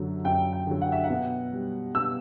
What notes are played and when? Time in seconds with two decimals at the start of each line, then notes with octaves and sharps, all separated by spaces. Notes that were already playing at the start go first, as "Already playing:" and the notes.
Already playing: F#2 D3 F#3
0.24 F#2 G5
0.53 G5
0.67 D3 F#3
0.82 F#5
0.92 E5
1.04 F#5
1.10 B2
1.52 G3
1.95 B2 E6